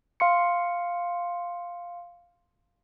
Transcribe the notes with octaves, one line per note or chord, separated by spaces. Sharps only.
F5 C6 C#7